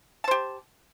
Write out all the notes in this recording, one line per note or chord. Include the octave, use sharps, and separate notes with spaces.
G4 C5 A5